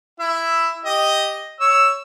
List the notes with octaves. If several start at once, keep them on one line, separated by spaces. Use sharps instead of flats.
E4 E5
G4 D#5
C#5 E6